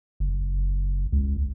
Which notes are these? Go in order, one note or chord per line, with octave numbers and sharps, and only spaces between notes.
F#1
C#2